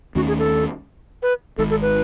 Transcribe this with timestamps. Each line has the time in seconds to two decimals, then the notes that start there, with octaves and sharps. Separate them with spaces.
0.15 D#2 D#3 A3 C#4 F#4
0.28 G#4
0.39 A4
1.23 B4
1.58 G#1 G#2 D#3 A4
1.70 A4
1.82 B4